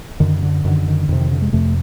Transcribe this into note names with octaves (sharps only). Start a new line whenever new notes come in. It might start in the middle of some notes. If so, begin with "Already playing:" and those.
F#2 D3 D#3
D3
F#2 D3 D#3
D#3
F2 C3 D#3
D#3
D3
G#3
F2 C3 A3